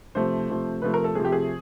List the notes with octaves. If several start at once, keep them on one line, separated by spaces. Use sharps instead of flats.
C3 F3 A3 C5
C3 F3 A3
C3 F3 A3 B4
A#4
A4
C3 F3 A3 G#4
G4
G#4